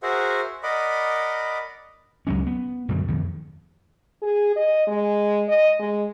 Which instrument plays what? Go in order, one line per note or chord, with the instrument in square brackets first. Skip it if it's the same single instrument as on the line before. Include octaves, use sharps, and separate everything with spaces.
[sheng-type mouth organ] F#4 G#4 A#4 C5 E5 F#5
A#4 D5 D#5 F#5 B5
[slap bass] C#2 F#2 F#3 C#4
B3
F#2 B2 D3 G3
F2 D#3
[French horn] G#4
D#5
G#3
D#5
G#3